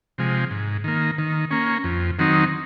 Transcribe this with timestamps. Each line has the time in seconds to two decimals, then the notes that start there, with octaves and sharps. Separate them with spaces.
0.18 C3 F3 G#3
0.51 G#2
0.84 D#3 A#3
1.18 D#3
1.51 A#3 C#4
1.84 F2
2.19 D#3 F#3 C4 D#4